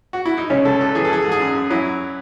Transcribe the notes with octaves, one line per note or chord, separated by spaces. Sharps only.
F#4
E4
D#4
C#2 C#4
C#2 A4
F#2 A4
E3 G#4
A4
E3 G#4
G#2 A4
G#4
F#2
F#2
F#3 E4